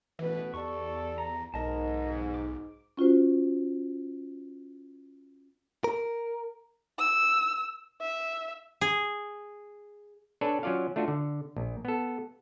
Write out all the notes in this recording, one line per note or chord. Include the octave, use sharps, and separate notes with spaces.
A1 B2 E3 B4
E2 G4 A4 D5 C#6
A#5
B1 G#2 A#4 D#5 A5
D6
C#4 F4 F#4 C5
A#4
E6
E5
G#4
D4 A4 B4 C#5 G#5
F#3 C#4 F4 D5 F5
A3 D4 F4 F#4
D3
A#1
B3 A4